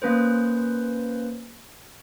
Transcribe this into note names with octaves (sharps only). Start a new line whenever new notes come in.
A#3 C#4 B4 C5